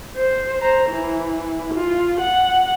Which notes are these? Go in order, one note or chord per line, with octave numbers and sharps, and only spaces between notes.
C5
C5 A#5
E3
F4
F#5